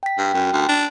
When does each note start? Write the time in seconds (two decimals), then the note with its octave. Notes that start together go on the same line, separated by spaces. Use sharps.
0.03 G5 B6
0.18 G2
0.34 F#2 G5
0.53 D2
0.68 D4